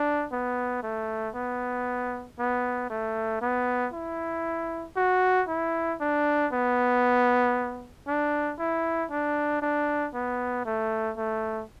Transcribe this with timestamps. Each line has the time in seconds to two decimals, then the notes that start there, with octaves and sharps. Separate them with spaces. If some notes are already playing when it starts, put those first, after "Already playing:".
Already playing: D4
0.32 B3
0.83 A3
1.35 B3
2.39 B3
2.90 A3
3.41 B3
3.93 E4
4.96 F#4
5.49 E4
6.01 D4
6.52 B3
8.07 D4
8.59 E4
9.11 D4
9.62 D4
10.14 B3
10.66 A3
11.17 A3